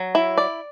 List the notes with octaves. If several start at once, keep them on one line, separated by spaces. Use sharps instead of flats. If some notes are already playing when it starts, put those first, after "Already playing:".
Already playing: F#3
E4
D5